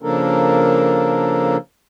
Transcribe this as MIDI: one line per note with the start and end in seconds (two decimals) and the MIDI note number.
0.02 1.56 49
0.02 1.56 53
0.02 1.56 58
0.02 1.56 62
0.02 1.56 69
0.02 1.56 70